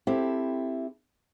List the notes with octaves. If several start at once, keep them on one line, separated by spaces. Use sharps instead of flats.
C4 E4 G4 A4